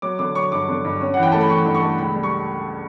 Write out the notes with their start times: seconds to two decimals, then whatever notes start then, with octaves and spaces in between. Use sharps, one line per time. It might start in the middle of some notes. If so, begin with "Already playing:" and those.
0.02 F#3 D6
0.19 D3 D6
0.35 F#3 C#6
0.52 G2 D6
0.68 D3
0.85 G2
1.01 C#4
1.14 E3 F#5
1.23 G5
1.32 A3 A5
1.41 B5
1.50 E3 C#6
1.66 G2
1.75 C#6
1.83 A3
1.98 C#2 B5
2.15 G3
2.23 C#6